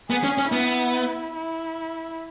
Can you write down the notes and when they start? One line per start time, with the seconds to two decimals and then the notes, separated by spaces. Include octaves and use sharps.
0.10 B3 G#4
0.24 C#4
0.38 C#4
0.52 B3 E4
1.35 E4